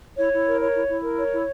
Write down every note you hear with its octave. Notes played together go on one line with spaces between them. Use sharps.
E4 C#5
E4
A#4
C#5
E4
E4
A#4
C#5
E4